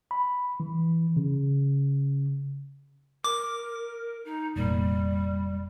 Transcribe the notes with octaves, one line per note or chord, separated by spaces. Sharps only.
B5
E3
C#3
A#4 D6
D#4
F1 A#2 G3